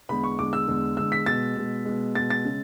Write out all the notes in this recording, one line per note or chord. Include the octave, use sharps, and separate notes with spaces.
E2 D3 G#3 B5
C#6
E2 D3 G#3 D6
E6
E2 D3 G#3
E2 D3 G#3 E6
B6
B2 G#3 A6
B2 G#3
B2 G#3
B2 G#3 A6
A6
C#3 G#3